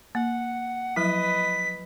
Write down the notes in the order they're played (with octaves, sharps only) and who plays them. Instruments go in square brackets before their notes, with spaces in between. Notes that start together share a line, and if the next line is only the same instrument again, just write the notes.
[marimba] A#3 [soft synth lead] F#5
[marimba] F3 F#3 E4 [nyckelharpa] B4 D#5 [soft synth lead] B6